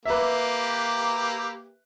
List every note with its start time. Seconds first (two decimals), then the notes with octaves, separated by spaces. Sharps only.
0.06 A#3 G4 B4 E5